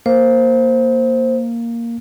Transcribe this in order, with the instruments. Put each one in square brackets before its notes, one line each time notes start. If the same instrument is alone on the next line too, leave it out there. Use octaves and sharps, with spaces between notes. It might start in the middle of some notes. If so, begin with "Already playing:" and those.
[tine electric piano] A#3 [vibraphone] C5